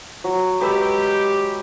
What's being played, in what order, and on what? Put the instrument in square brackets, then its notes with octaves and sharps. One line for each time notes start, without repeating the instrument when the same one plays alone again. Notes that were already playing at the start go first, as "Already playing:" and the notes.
[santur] F#3
[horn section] G#3 G4 [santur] B4 E6